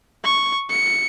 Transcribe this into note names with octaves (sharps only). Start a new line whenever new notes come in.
C#6
C#7